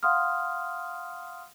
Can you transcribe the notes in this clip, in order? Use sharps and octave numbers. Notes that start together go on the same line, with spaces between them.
F5 F#5 C6 D#6 F6